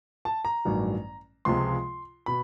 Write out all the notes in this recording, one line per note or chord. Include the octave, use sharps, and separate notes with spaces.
A5
A#5
A1 G2 D#3 F#3
C#2 C3 F3 G#3 C6
B2 B5